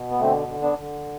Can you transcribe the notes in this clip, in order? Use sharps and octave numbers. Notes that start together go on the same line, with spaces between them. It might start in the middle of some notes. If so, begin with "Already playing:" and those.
Already playing: B2
B3
D3 A3 C4
D3
B3 D4
D3